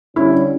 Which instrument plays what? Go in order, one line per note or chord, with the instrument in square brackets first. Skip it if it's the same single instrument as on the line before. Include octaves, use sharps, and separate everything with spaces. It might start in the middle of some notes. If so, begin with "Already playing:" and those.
[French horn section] D3 G3 C#4 [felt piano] E4